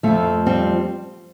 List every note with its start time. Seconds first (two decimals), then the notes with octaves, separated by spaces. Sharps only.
0.03 F2 F3 A3
0.46 G3 C4